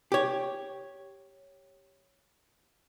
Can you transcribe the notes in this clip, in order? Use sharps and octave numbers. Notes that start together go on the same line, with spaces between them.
G4 C#5